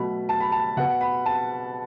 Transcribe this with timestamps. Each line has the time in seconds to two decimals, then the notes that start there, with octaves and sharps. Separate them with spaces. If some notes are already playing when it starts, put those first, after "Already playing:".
Already playing: B2 F#3 A3 B5
0.29 A5
0.40 B5
0.52 A5
0.77 B2 B3 F#5
1.01 B5
1.26 A5